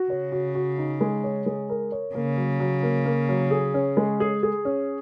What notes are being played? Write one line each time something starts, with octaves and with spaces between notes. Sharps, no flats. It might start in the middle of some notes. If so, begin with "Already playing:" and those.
Already playing: F#4
C#3 C#5
F#4
F#4
D#4
G#3
C#5
G#3
A#4
C#5
C#3 A#3
F#3
F#3
A#3
A#3
F#3
G#4
C#4
G#3
G#4
G#4
C#4